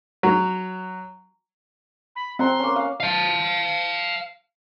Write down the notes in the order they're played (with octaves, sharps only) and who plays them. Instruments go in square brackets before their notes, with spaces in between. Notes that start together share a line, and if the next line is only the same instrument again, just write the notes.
[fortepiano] F#3
[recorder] B5
[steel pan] C4 [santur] F#5 A#5 [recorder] C6
[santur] A#3 C#4
F5
[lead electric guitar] F5 A5